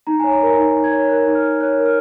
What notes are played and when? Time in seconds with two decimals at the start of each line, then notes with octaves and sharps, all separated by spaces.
0.07 D#4 A#5
0.20 C#5 G#5
0.32 A#5
0.41 A#4 G#5
0.58 D#4
0.76 D#4
0.84 G#6
0.92 C#5
1.09 A#4 F#6
1.26 D#4
1.35 F6
1.43 D#4
1.61 C#5 F#6
1.77 A#4
1.86 F6